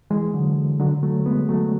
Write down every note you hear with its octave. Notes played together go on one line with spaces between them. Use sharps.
E3 G#3
D3 F#3
D3 F#3
F#3 A3
G#3 B3
F#3 A3